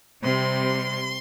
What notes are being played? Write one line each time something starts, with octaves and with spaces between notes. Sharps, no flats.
C3 G3 C4 C6